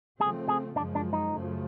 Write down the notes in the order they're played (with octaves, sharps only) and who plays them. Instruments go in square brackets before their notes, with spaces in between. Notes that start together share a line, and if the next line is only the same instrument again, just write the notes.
[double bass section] C#3 F3 A3 C4 [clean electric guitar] G#4
[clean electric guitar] G#4
[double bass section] F#2 C#3 F3 G#3 [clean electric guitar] D4
[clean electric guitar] D4
D#4
[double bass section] F#2 C#3 F3 A3